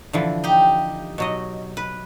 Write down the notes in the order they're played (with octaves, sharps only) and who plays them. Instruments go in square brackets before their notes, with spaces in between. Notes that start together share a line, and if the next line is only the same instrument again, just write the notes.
[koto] D3 E3 F3
[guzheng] D#4 G4
[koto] B2 F#3 D#5
B4